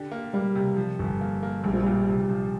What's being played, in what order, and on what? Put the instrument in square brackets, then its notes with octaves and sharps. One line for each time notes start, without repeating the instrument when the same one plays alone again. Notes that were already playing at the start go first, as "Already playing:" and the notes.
Already playing: [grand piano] D3 G4
A#3
[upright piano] G3 [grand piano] A#3
[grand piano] C3
F3
G1
A#3
A#3
[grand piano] A#1 [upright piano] G3
[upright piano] F3
[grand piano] A#2 [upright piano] G3
[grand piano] C3
F3